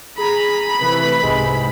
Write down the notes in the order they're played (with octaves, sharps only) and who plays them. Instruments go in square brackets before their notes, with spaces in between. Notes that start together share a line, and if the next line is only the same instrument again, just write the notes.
[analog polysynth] G#4 A#5 [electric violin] B5
[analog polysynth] C3 E3 A3 [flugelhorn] B4
[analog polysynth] C2 G#2 C3 [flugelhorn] G#3